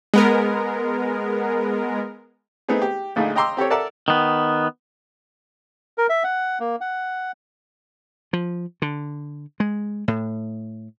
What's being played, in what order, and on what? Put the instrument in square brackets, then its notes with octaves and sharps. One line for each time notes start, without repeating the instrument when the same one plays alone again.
[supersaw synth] G#3 B3 A#4
[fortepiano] A3 B3 C4 D#4 G#4
G4
A#1 D3 A3 D#4 G#4
D#5 G5 A#5 C6 D6 E6
C4 G4 A4 C#5
A4 A#4 D5 E5 F#5 A5
[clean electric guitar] D#3 B3
[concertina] A#4
E5
F#5
A#3
F#5
[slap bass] F3
D3
G#3
A2